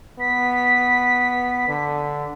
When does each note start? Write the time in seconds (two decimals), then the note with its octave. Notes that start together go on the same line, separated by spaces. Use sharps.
0.20 B3 B6
1.68 D3